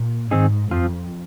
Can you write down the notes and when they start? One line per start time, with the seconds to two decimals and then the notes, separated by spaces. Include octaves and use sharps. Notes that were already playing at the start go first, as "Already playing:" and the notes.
Already playing: A#2
0.31 G#2 D#3 C4 D#4 G#4
0.71 F2 F3 C4 F4